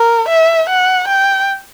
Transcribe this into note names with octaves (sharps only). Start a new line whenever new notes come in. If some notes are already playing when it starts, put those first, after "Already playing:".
Already playing: A#4
E5
F#5
G5